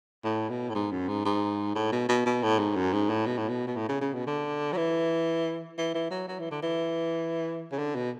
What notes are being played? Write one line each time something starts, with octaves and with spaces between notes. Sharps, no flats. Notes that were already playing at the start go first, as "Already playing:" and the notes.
A2
B2
A2
G#2
F#2
G#2
G#2
A2
B2
B2
B2
A2
G#2
F#2
G#2
A2
B2
A2
B2
B2
A2
C#3
C#3
B2
D3
F#3
E3
E3
E3
F#3
F#3
E3
D3
E3
C#3
D3
B2